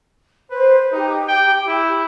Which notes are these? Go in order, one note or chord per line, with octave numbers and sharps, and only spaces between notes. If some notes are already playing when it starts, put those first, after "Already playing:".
B4 C5
D#4 G4
G5
E4